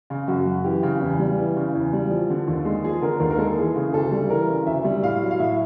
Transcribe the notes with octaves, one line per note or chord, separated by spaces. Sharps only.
C#3
F#2 F#4
F#2
E3 G4
C#3
E2
G3
E3
C#3
E2
G3
F3
D3
D#2
G#3
F3 G#4
D3 A#4
D#2 A#4
A#4
G#3 A4
E3 G#4
C#3
D2 A4
G3
E3 A#4
C#3
D2 E5
G3
A2 F5
F#3
F5
A2 E5